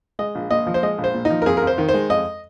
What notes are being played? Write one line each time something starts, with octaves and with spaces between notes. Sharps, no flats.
G#3 D#5
A#1
A#2 D#5
F3
C5
G#3 D#5
A#1
C5
A#2
D#4
F3
A#4
F2 G#4
A#4
F2
C5
D#3
C5
G#3
F2 D#5